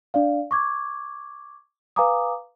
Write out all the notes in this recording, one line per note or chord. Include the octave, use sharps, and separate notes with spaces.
D4 D5 F5
C#6 D6 G#6
B4 F5 G#5 A#5 D6 D#6